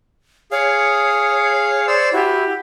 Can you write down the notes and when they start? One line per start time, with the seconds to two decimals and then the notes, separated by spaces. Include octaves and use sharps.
0.52 G#4 C#5 F5
1.87 C5 D5 E6
2.13 E4 F#4 G4